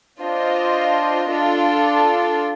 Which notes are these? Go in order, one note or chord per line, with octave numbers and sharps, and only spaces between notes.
D4 F4 C5 D#5
D4 F4 A4